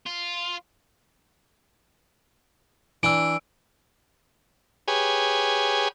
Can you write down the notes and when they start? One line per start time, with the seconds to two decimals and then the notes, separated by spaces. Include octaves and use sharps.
0.06 F4
3.03 E3 D4 E6 D7
4.88 G4 G#4 B4 C#5 G#5